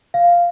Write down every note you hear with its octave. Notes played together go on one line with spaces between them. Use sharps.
F5